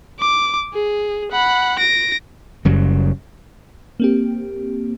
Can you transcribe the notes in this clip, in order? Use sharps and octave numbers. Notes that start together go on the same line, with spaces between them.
D6
G#4
F#5 B5
A#6 D7
F#1 C#3 F#3 G3
A#3 C4 G4